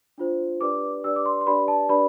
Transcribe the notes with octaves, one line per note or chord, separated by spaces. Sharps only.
D4 F4 C5
D4 G4 B4 D5 D6
D4 G4 B4 D5 E6
D6
C6
C6
D4 G4 B4 D5 B5
A5
D4 G4 B4 D5 B5